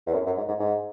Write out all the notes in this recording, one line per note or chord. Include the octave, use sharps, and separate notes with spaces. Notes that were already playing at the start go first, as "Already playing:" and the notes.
E2
F#2
F#2
G#2
G#2
G#2